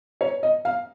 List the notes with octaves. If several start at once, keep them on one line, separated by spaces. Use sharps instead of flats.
C#5
D#5
F5